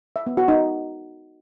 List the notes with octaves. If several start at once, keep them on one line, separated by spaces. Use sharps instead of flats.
E5
B3
F#4
D#4